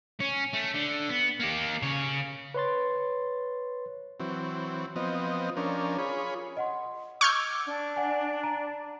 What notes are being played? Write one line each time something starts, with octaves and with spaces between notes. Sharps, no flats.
C#4
A3
D3
B3
A#3 G4
C#3 C#5
B4 C#5 C6 A6
E3 F#3 C4
F3 B3 C4 D#5
F3 C#4 D4 A#4
F4 G#4 C#5 B5
D#5 F#5 C6
C#6 D6 E6 F6 G6 G#6
D4
D5 F#5 G#5
A#5